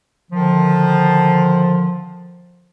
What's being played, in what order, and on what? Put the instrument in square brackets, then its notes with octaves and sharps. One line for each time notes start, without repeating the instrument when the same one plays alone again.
[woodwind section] D3 D#3 F3